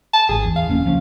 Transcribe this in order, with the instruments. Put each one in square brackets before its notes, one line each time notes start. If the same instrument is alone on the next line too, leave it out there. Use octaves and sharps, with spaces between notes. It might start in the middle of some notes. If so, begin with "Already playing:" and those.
[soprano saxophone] A5
[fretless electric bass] G#1 [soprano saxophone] G#4
[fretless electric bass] E2
[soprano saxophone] F5
[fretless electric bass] D#1 A#3 C#4
C#2 F3 C#4